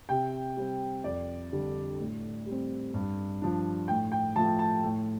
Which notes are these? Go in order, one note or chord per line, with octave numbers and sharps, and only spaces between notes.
C3 G5
G3 C4
F2 D5
D3 G3 D4
A2
G3
C4
G2
F3 D4
A2 G5
G5
F3 A3 A5
A5
A2